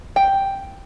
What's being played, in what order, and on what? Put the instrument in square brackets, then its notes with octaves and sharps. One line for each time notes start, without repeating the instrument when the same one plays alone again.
[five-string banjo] G5